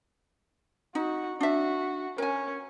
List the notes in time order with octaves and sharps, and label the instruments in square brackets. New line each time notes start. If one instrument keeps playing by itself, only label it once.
[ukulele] D#4 [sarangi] F#4
[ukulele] D4 E5 [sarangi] F#4
[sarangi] C#4 [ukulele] A#4 G#5